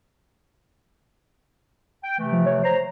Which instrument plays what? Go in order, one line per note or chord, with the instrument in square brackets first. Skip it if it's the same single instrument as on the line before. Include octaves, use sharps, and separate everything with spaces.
[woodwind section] G5
C3 E3 A3
[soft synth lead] F3
C#5
[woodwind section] C5 A#5